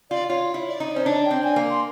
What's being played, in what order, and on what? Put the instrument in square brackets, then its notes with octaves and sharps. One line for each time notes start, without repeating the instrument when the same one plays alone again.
[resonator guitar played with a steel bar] F4 [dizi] D5
[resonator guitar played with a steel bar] F4 [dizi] C#5
[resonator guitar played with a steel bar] E4
[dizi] D5
[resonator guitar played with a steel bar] D#4
[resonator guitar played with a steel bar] C#4 [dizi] C5
[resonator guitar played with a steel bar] D4 [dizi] C#5
[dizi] G5
[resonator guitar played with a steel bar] C4
[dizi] G#5
[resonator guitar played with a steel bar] A#3
[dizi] C6